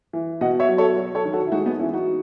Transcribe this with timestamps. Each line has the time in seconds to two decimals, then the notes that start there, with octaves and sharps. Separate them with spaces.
0.13 E3
0.41 B2 D#5 F#5
0.60 C#5 E5
0.69 F#3
0.78 A4 C#5
0.96 F#3
1.15 A4 C#5
1.25 D#3
1.33 F#4 A4
1.47 E4
1.52 G#3 D#4 F#4
1.65 B3 D#4
1.79 E3 C#4 E4
1.94 D#4 F#4